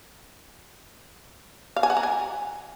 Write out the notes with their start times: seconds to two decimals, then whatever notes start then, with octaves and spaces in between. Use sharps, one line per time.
1.76 F5
1.83 G#5
1.90 F#5
1.97 A#5
2.03 G#5